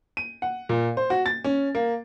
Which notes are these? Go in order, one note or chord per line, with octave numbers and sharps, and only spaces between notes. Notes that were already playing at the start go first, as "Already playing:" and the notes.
D#7
F#5
A#2
C5
F#4
A6
C#4
A#3